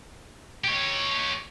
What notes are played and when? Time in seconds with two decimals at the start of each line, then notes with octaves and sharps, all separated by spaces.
0.64 G4 C#5